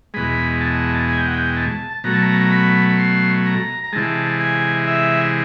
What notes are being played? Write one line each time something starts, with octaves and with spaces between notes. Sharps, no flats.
E2 B2 G#3 B5
A5
G#5
G5
F#5
G5
A5
B2 F#3 A3 A#5
A5
A#5
A#5
B5
C6
A#5
A#5
C3 E3 G#3 A5
G#5
E5